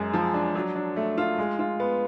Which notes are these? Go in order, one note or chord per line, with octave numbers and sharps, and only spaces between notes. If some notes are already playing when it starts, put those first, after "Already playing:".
Already playing: F#2 G#3
F3
D4
F#3
D4
A3
F4
G#3
F4
B3